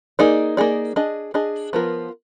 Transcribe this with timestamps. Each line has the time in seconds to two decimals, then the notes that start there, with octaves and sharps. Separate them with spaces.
0.19 A#3 D#4 G#4 D5
0.57 A#3 D#4 G#4 D5
0.96 D4 G#4 D#5
1.34 D4 G#4 D#5
1.73 F3 B3 F4 A#4